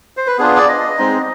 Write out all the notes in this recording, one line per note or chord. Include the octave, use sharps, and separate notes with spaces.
C5
B4
B3 D4 F4 G#4
D5
D#5
G#3 C4 D#4